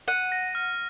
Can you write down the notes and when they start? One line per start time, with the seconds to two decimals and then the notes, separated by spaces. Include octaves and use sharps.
0.08 F#5 D#7
0.32 A#6
0.55 F6